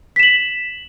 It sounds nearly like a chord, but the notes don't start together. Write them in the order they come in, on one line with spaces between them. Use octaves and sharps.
B6 E7 F#7